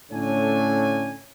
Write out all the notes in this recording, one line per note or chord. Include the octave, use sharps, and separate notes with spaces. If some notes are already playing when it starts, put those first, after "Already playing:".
A2 D3 A3 C#4 C#5 G#5